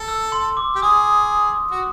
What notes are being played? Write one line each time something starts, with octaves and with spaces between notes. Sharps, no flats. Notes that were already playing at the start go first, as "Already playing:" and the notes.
Already playing: A4
E6
C6
D6
G4
G#4 D#6
F#4